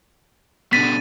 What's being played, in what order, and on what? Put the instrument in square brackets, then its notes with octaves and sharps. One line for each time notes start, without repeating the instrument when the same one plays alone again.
[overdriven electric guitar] B2 D3 [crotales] A6 D#7 [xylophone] B6